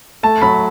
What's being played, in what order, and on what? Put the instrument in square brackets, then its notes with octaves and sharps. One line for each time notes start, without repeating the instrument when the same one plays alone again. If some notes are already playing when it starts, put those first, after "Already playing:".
[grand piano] A3 A5
F#3 B5